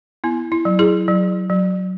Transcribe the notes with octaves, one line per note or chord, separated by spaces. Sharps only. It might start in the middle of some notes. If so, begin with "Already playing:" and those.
B3 E4
E4
F#3
E4 G#4
F#3
F#3